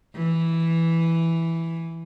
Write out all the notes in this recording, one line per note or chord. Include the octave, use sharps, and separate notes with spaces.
E3